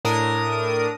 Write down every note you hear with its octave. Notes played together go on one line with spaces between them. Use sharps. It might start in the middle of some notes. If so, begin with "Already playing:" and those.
A2 D4 A#4 D#6